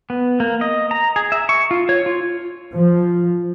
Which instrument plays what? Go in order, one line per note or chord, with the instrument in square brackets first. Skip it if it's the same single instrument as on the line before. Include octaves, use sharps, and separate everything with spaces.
[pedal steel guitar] B3
A#3
D#5
A#5
G#4
E5
C#6
F4
C#5
F4
[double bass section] F3